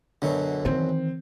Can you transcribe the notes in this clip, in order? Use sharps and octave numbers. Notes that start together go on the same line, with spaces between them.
F#2 B2 D3 F#3
D#3 E3 C4